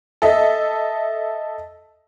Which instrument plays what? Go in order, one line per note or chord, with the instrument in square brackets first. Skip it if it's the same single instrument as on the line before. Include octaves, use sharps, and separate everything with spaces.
[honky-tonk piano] A4 D#5 E5